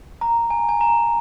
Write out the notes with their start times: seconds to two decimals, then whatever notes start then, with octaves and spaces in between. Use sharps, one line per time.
0.21 A#5
0.50 G#5
0.69 G#5
0.81 A#5